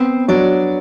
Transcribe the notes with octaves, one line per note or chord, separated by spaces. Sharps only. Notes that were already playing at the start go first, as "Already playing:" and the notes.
Already playing: B3 C4 C5
F#3 D4 D5